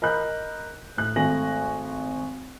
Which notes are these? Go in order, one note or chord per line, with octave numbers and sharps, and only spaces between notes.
A#4 D#5 B5 F#6 G6
A2 F#6
G#1 A3 G#5 A#6 F#7